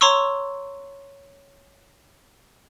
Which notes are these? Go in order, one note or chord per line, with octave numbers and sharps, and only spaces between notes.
C#5 A#5 C6 C#6 E6